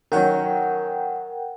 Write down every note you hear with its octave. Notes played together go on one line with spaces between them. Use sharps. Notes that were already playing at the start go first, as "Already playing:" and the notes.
D#3 F#3 C#4 A#4 F#5 G5